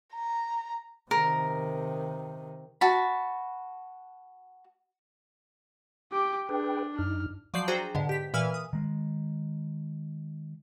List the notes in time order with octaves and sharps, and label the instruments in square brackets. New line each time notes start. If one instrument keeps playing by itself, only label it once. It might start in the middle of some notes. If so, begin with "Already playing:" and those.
[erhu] A#5
[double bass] C3 D#3 [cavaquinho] A#4
[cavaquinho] F#4 A5 B5
[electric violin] G4 D6
[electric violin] D4 [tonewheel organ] G#4 B4 G5
[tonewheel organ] F#2 D#4 [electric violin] F6
[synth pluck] F3 F#3 D5 G6 C7
D4 F#4 G#4 C5 G5 A#5
G#2 B2 D3
G4 B6
A#2 E3 B4 G#5 E6 F6
D#6
[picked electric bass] D#3 G#3